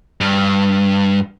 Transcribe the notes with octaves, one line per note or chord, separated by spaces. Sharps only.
G2